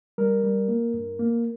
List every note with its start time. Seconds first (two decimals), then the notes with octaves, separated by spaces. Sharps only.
0.18 G3 A#4
0.44 G3
0.68 A#3
0.94 G2
1.19 A#3